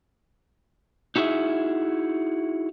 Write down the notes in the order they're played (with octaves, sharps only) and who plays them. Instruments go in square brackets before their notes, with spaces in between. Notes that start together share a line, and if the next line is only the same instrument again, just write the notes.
[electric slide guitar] D#4 E4 F#4 G#4 E5